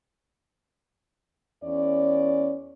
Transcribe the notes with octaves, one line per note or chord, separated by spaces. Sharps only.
E2 C#4 C#5 D5